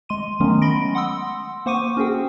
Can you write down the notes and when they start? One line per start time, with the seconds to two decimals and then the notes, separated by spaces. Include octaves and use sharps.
0.09 G#3 C6 D#7
0.40 D#3 F#3 G#3 A3 B3 C#4
0.62 B5 C6 A#6 D7
0.95 F#5 C6 D#6 E6
1.66 A#3 C5 F#5 C#6 D6 D#7
1.97 C#4 F#4 G#4 G5